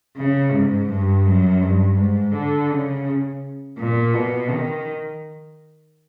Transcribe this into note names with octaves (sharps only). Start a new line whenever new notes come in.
C#3
G#2
G2
F#2
G2
G#2
D3
C#3
A#2
B2
D#3